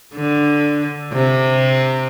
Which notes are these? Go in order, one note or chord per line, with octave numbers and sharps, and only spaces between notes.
D3
C3